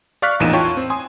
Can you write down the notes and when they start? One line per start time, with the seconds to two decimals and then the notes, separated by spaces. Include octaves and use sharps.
0.22 D5 F5 C#6 F6 F#6 B6
0.40 A1 E2 A#2 D#4 D#7 E7
0.53 E4 F4 C#5 G5 A5 C#6
0.77 C4
0.90 G#5 C6 D#6